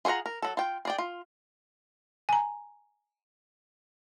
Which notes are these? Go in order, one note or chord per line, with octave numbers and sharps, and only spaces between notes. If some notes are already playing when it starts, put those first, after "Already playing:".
F4 G#4 C#5 F#5 A#5
A#4
F#3 A4
F4 G5
G#4 D5 G5
F4
G#5 A#5